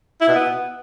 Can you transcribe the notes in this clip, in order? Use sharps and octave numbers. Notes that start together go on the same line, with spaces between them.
E4
B2
B3